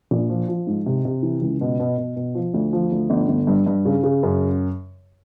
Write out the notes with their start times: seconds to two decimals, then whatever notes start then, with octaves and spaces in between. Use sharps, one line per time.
0.11 A#1
0.29 F3
0.48 F3
0.67 G#2
0.86 C3
1.05 C3
1.23 E3
1.42 C#2
1.61 B2
1.80 B2
1.98 B2
2.16 B2
2.35 F3
2.54 D2
2.73 F3
2.92 D2
3.10 G1
3.28 G1
3.47 G2
3.66 G2
3.85 C#3
4.03 C#3
4.23 F#2